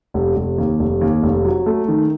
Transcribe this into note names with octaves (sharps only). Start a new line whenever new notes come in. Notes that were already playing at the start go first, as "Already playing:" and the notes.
F1
F1
D#2
F1
D#2
F1
F#3
A3
D#3